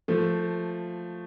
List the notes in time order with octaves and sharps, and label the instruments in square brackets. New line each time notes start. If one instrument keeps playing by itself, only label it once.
[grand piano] F3 A3